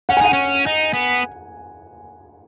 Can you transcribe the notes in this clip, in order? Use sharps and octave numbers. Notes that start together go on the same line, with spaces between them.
C#4 F#5
G#5
D#4 F#5
C#4
D#4
B3